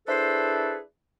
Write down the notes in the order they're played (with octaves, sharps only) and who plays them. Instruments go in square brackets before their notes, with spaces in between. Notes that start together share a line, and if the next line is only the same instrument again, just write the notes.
[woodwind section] D4 E4 G#4 A4 B4 C5